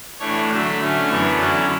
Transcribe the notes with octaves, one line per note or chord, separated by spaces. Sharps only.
A2 E3 A3 D4 C#5
D3 F#3 A3 E5
D3 A3 C#4
F#2 E3 B3 D4 C#5
D3 F#3 C#4 E4 A4